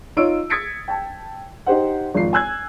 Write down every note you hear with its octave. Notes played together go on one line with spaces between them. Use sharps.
D#4 F4 C#5 E6 D7
D#6 G#6 A6 B6 C#7 D7
G5 A5
D#4 G4 C5 F#5
G#1 F2 C7
G#5 E6 F#6 G#6